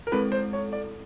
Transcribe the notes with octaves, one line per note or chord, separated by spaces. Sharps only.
A#4
G#3 C4 E4 A4 B4
C5
C#5
D5